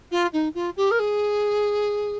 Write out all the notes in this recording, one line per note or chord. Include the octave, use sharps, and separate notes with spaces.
F4
D#4
F4
G4
A#4
G#4